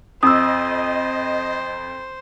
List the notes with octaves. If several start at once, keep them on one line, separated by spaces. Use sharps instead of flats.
F2 C5 D#5 D#6 E6